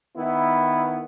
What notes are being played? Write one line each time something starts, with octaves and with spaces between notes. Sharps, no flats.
D#3 B3 E4